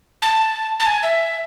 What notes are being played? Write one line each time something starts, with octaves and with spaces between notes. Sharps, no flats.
A5
A5
G#5
E5